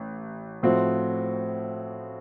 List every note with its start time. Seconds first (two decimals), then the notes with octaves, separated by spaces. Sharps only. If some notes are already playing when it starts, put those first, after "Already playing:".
Already playing: A1
0.63 A2 F3 C4 F#4